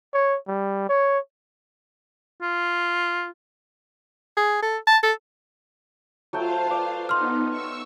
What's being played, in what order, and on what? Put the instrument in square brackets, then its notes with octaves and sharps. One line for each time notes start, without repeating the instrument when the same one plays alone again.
[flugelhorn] C#5
G3
C#5
[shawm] F4
[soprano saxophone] G#4
A4
A5
A4
[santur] F#3 A3 G5 [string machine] F4 C5 F5
[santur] B4 D5
[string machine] B3 D#4 [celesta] C6 F6
[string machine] C#6 E6